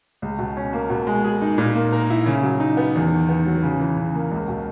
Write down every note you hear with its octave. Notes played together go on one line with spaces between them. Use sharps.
C#2
B2
C#4
A#3
B2
G#3
G#4
D#4
A#2
A#3
A#4
E4
C#3
F#3
D#4
B3
E2
D#3
B3
F#3
C#3
E3
C#3
A#3
C#2
B2